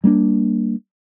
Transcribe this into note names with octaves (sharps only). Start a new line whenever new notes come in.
G3 A#3 C#4 D4